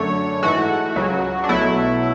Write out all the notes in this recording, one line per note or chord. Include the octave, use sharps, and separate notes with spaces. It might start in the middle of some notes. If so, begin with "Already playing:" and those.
Already playing: F#2 D3 A3 C#5
G#2 E3 A3 F#4
C#2 C#3 F#3
D4
B1 B2 F#3 A3 E4